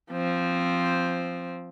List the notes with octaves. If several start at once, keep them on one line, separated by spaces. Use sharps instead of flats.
F3 C4